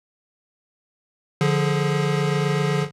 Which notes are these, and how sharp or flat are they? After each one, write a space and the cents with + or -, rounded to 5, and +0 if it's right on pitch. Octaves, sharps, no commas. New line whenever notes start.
D3 +0 F3 +0 G#4 +15